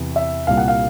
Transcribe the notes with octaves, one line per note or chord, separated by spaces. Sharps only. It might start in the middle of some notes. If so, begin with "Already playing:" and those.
Already playing: E2 C3 E3
E5
C2 A#2 G3 F5
F#5
F5